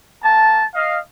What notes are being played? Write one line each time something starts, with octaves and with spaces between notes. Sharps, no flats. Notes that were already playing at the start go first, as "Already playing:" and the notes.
A#3 A5
D#5 F5